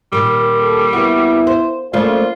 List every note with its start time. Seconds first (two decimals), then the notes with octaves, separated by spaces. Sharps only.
0.13 A#2 D#3 G3
0.60 A4
0.93 C#3 A#3 B3 E4 F#4
1.47 C5
1.93 C#3 F3 A3 A#3 F4 C5 D5